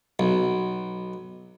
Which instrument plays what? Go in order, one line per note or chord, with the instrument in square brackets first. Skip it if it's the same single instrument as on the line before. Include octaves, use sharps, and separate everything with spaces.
[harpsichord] B1